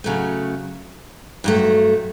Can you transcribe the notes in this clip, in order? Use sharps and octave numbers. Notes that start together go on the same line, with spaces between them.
C#3 F#3 A3
G2 F#3 A3